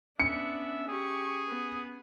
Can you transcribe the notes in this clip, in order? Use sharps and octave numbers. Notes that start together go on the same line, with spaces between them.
B3 C#4 D4 E5 C#7
G4 G#4 C#6
B3